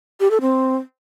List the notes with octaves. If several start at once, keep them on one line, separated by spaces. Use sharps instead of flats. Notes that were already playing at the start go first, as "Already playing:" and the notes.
G4
A4
C4